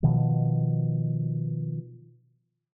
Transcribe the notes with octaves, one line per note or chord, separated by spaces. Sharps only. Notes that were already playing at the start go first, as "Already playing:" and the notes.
B2 D#3 F3